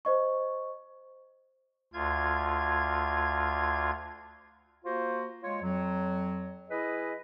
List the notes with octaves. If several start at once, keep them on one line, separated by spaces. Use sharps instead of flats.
C5 D#5 C#6
D2 F4 G#6
A#3 F4 F#4 C5
G#3 F4 C#5
F2 F#3
E4 G#4 B4 D#5